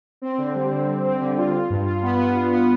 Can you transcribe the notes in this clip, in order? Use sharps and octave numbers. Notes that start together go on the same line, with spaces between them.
C4
D3
G3
D3
G3
C4
D3
F4
F4
G2
F4
B3
B3
F4
B3